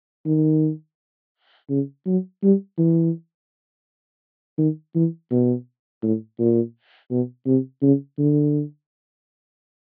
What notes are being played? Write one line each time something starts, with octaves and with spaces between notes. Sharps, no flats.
D#3
C#3
F#3
G3
E3
D#3
E3
B2
A2
A#2
B2
C3
C#3
D3